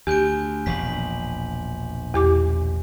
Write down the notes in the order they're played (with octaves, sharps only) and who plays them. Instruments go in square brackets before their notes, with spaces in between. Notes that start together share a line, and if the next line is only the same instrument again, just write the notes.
[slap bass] D2 [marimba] G4 [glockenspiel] G#5 G6 D7
[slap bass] E1 A#1 [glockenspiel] B6 F#7
[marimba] E2 G4 D6